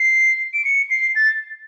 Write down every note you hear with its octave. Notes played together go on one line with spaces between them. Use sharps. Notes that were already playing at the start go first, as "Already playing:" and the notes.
Already playing: C7
D7
C#7
C7
A6